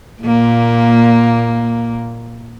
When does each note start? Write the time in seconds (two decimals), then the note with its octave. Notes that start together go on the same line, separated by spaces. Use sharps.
0.23 A#2 A#3